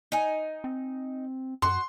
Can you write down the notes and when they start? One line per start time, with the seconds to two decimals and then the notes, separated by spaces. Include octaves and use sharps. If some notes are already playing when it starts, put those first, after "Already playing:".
0.12 D#4 G#5
0.64 C4
1.62 F#2 F#4 C6